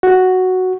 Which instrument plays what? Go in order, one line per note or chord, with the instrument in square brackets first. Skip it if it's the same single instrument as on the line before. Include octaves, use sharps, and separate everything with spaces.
[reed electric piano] F#4